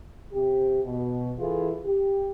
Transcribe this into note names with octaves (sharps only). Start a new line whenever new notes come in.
C3 G4
B2
E3 E4 F4 G#4 A4
G4